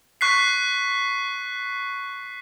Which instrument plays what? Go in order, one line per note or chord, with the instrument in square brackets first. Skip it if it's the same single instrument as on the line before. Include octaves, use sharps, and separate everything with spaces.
[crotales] C#6 F#6 B6 C7